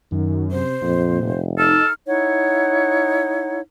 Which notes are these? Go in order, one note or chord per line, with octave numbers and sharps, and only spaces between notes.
F#2 D#3
C3 C5
F2 A#2
F1
D#4 A4 F6
D#4 E4 C#5 F#5